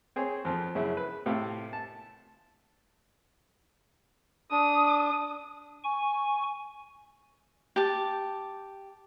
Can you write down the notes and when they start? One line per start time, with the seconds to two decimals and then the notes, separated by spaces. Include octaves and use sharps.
0.16 C4 G#4 C5 C#5
0.45 F2 F3
0.75 F#2 C#3 E4
0.97 B4
1.26 A2 C3 A4 F5
1.73 A5
4.52 D4 D#6
5.84 G#5 C#6
7.76 G4 A5